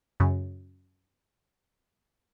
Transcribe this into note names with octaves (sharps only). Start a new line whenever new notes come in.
F#2 C#3